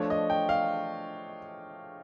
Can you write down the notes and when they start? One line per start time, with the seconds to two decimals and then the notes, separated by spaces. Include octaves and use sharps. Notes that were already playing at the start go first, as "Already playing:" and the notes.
Already playing: F3 A3 D4 C#5
0.10 D#5
0.30 G5
0.49 F5